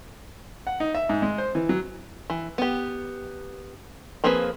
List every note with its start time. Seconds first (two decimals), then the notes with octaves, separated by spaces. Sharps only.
0.67 F#5
0.80 D#4
0.95 E5
1.09 G#2
1.22 G#3
1.38 C5
1.55 E3
1.69 F#3
2.30 E3
2.58 B3 G4
4.24 F3 A#3 C4 G#4 B4